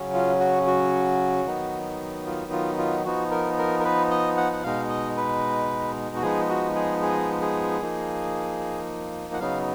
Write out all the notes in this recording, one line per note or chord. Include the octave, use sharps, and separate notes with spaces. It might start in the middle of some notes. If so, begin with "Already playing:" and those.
Already playing: C#3 F#3 C#4
F4
F#4
F#4
D#3 F#3 B3 D#4
F4
F4
F4
F3 B3 D#4 F#4
A#4
A#4
A#4
B4
D#5
F#5
F#5
B2 G#3 D#4 F5
D#5
B4
F#4
F3 G#3 B3 D#4 G#4
F#4
G#4
G#4
G#4
F3 A#3 D#4
F#5
C#3 F#3 B3 D#4 F5